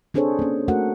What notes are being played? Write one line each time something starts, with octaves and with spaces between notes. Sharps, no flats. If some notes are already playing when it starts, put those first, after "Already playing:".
C4 D4 G#4 A4 C5 C#5
A#3 C#4
A3 F#4 A4 A#4 F#5